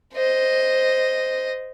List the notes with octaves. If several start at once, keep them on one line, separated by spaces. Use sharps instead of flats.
C5 D#5